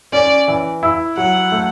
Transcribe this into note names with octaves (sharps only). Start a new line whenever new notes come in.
C#4 D5
E3
E4
F#3 F#5
A3